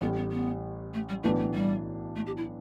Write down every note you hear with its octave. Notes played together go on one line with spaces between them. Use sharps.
A1 A2 G3 B3
B3
B3
A3
G3
B1 A2 E3 A3 B3 D4
A3
G3
A3
G4
E4